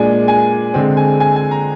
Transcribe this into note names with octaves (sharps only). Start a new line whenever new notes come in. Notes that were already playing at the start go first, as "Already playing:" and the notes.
Already playing: A#2 G#3 D4 G#5
G#5
D3 G#3 C4
G#5
G#5
G#5
A#5